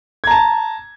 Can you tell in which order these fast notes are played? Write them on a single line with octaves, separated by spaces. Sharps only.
G#6 A#5 A5